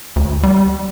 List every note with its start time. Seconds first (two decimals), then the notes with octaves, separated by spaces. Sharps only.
0.16 D2
0.43 G3